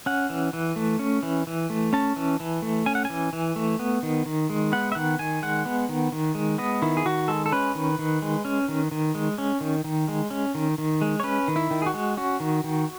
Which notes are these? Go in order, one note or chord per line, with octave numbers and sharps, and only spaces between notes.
C#4 F#5
E3
E3
A3
C#4
E3
E3
A3
C#4 A5
E3
E3
A3
C#4 G#5
F#5
E3 G#5
E3
A3
B3
D#3
D#3
G#3
B3 F#5
E5
D#3 F#5
D#3 G#5
G#3 F#5
B3
D#3
D#3
G#3
B3 D#5
D#3 E4
G#4
D#3 F#4
G#3 A4
A4
C#4 B4
D#3
D#3
G#3
C#4
D#3
D#3
G#3
C#4
D#3
D#3
G#3
C#4
D#3
D#3
G#3
C#5
C#4 B4
D#3
E4
D#3
G#4
F#4
G#3
C#4 F#4
D#3
D#3